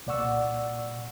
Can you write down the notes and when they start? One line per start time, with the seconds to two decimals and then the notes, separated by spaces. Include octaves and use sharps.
0.06 C2 A#2 D5 F#5 C#6 E6